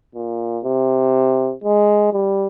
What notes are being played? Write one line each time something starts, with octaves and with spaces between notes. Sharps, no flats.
A#2
C3
G#3
G3